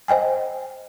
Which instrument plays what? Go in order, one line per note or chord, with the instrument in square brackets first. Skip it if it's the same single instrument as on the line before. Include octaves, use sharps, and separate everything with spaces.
[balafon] C5 D#5 G5 G#5